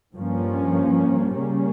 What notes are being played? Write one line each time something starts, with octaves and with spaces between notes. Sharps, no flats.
G2 F3 A#3 C#4
C#3 G3 A#3 C#4